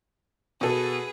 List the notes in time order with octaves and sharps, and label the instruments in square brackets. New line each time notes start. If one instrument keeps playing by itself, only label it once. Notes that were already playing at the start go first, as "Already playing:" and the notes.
[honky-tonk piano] B2 A4 [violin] G#4 B4